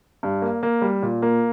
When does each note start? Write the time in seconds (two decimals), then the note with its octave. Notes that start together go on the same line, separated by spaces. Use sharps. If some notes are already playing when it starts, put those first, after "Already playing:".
0.23 G2
0.42 A#3
0.63 A#3
0.81 G3
1.02 A#2
1.22 A#3